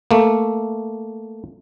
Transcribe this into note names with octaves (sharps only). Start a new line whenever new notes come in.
A3 A#3